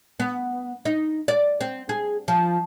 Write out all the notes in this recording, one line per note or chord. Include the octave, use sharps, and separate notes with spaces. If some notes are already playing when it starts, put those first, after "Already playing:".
B3
D#4
D5
C4
G#4
F3